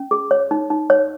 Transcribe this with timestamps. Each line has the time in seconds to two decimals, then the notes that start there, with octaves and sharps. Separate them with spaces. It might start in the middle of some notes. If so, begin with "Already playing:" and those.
Already playing: C#4
0.11 G#4
0.31 C#5
0.51 D#4
0.70 D#4
0.90 C#5